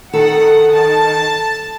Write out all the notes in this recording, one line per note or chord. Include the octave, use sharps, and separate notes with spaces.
D#3 A4 F#5
A5